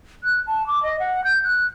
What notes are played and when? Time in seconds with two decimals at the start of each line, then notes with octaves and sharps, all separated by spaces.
0.24 F#6
0.47 A5
0.67 D6
0.83 D#5
0.99 F#5
1.24 G6
1.44 F#6